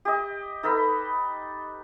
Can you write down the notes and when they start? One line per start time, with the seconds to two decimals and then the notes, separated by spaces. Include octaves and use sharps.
0.05 G4 D#5
0.63 D#4 A4 B4 B5